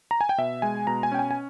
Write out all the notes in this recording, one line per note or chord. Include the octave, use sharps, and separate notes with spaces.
A#5
G#5
G5
B2 E5
G#3 G#5
B2 A#5
G#5
C#4 G5
G#5
G#5